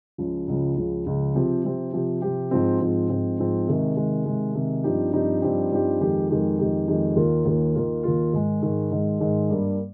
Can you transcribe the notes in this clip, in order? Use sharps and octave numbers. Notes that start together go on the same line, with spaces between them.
C#2 C#3 F3
C#2 C#3 F3
C#2 C#3 F3
C#2 C#3 F3
C3 F3 C4 G4
C3 F3 C4 G4
C3 F3 C4 G4
C3 F3 C4 G4
G#2 F3 C4
G#2 F3 C4
G#2 F3 C4
G#2 F3 C4
C3 D#3 G#3
C3 D#3 G#3
C3 D#3 G#3
C3 D#3 G#3
G2 F3 C4 D#4 G4
G2 F3 C4 D#4 G4
G2 F3 C4 D#4 G4
G2 F3 C4 D#4 G4
F2 D#3 G#3 D#4 G4
F2 D#3 G#3 D#4 G4
F2 D#3 G#3 D#4 G4
F2 D#3 G#3 D#4 G4
D#2 D#3 A#3 F4
D#2 D#3 A#3 F4
D#2 D#3 A#3 F4
D#2 D#3 A#3 F4
G#2 D#3 G#3
G#2 D#3 G#3
G#2 D#3 G#3
G#2 D#3 G#3
G2 G3 A#3